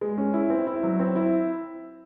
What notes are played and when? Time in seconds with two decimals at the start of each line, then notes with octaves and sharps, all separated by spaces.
0.01 G#3
0.18 C#4
0.34 E4
0.50 C4
0.67 E4
0.83 F#3
0.99 C4
1.16 E4